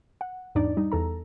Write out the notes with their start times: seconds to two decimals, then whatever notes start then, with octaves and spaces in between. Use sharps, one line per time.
0.21 F#5
0.55 E2 G#2 D4 D#4 D5
0.77 G3 D#4
0.92 E2 A4 A#5